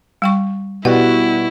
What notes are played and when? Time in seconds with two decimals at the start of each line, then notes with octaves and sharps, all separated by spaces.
0.22 G3 G5 C#6
0.85 B2 G3 E4 F#4 F#5